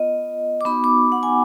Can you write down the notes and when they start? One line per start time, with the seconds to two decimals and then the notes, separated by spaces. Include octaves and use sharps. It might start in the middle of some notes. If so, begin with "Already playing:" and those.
Already playing: B3 F4 D#5
0.61 D6
0.65 B3 D#4 F#4 B5
0.84 D6
1.12 F#5
1.23 G#5